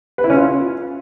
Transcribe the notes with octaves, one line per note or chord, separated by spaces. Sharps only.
B4
E4
C#4
F4